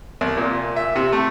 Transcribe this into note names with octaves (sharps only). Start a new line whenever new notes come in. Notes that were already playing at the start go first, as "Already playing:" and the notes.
C2
A#2
E5
C3
A3